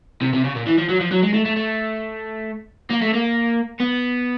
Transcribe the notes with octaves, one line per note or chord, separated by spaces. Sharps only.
C3
C3
C#3
A#2
E3
F3
F#3
F3
F#3
G#3
A3
A3
A3
A#3
A3
A#3
B3